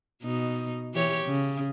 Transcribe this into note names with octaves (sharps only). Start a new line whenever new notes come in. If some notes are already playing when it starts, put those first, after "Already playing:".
B2 D#4
E3 G4 C#5
C#3